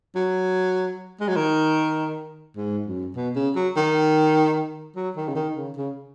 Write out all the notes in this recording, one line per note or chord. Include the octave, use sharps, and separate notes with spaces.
F#3
G#3
F#3
D#3
G#2
F#2
B2
C#3
F#3
D#3
F#3
D#3
C#3
D#3
C#3
C#3